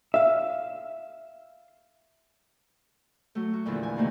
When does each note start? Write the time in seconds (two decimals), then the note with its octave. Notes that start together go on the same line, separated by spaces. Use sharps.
0.14 E5 F5
3.35 F#3 A3
3.53 F#4
3.65 E2 A#2 D3 E3 F3
3.83 G#5
3.97 C3 D#3 A3 A#3